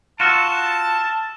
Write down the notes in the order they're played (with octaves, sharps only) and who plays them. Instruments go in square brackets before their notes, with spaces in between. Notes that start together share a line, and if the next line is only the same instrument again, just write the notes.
[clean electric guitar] F4 F#4 [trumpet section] A5 [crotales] E6 F6 E7